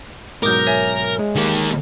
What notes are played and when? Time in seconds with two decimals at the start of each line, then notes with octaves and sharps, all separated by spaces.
0.43 G#2 B2 F#3 A#4 D6 D#6 G6
0.67 C#5 E5 G#5
1.19 G#3
1.36 D#3 A#3